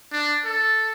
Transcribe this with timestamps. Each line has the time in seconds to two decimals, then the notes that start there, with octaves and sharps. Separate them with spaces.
0.12 D4
0.45 A4